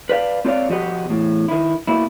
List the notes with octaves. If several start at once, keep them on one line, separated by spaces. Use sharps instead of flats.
B4 D5 E5 F5
C4 F4 C#5 D5 F5
B2 F3 F#4 G4 D#5 F#5
E2 A2
D#3 E4
B2 A#3 E4